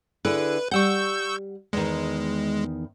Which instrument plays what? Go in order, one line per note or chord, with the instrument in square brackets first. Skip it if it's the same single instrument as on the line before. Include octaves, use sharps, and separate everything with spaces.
[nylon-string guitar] D3 E4 G#4 [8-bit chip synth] B4
[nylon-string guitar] G3 F#5 [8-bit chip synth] C#6 E6 G6
[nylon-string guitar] E2 D#3 [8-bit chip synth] G#3